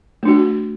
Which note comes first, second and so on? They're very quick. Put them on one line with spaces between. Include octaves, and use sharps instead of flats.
A3 D4 F#4